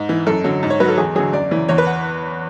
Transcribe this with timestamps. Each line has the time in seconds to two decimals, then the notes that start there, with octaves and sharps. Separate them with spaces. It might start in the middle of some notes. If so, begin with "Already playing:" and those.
Already playing: G#2
0.09 E3
0.27 F#2 A4
0.44 D3 F#3
0.63 G#2
0.70 C#5
0.80 F#3 B4
0.88 A4
0.98 E2 G#4
1.15 D3 F#3 G#4
1.33 F#2 D5
1.51 C#3 E3
1.68 E2 C#5
1.78 B4
1.87 F#5